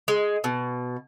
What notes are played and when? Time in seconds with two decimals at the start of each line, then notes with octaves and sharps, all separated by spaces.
0.08 G#3
0.44 B2